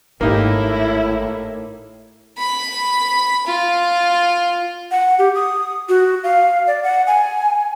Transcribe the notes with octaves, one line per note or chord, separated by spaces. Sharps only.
G#1 A2 A#3 D#4 E4 G4
B5
F4
F#5
G4
D#6
F#4
F5
D5
F#5
G#5